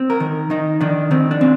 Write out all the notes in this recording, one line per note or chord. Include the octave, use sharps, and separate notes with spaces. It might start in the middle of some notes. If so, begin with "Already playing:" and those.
Already playing: C4
A#4
D#3
D#3 D#4
D#3 D4
D#3 C4
D4
C4